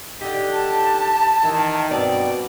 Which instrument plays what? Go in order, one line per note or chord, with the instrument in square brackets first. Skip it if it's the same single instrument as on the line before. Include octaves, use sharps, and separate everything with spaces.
[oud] D3 D#4 [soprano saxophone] G4
[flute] A5
[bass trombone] D#3 [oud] E3 E5
[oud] G2 C4 [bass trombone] B2 [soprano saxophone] D5